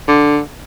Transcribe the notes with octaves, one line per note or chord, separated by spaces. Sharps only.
D3